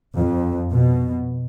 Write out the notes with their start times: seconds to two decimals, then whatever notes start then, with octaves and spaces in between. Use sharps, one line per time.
0.17 F2
0.73 B2